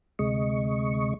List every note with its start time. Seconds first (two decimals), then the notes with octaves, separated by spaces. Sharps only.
0.19 D2 C3 G#3 D#5 C#6